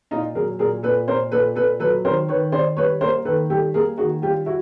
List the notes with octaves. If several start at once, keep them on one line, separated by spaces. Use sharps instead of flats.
A#2 D#4 F4
F#3 G#4 A#4
A#2 G#4 A#4
A#2 A4 B4
A#2 A#4 C5
A#2 A4 B4
A#2 A4 B4
F#3 A4 B4
D#3 A#4 C5
D#3 B4 C#5
D#3 C5 D5
G3 B4 C#5
A#3 A#4 C5
D#3 A4 B4
G3 G4 A4
A#3 G#4 A#4
D#3 F#4 G#4
G3 F4 G4
E4 F#4